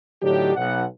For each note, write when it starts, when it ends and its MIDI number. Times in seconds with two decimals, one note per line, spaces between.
0.21 0.52 45
0.21 0.52 50
0.21 0.52 54
0.21 0.52 62
0.21 0.52 63
0.21 0.52 67
0.56 0.83 35
0.56 0.83 78